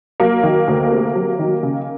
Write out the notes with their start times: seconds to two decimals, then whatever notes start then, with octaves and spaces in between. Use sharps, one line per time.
0.20 F#3 A#3
0.43 D#3
0.68 D2
0.92 C3
1.15 F#3
1.39 D#3
1.63 C#3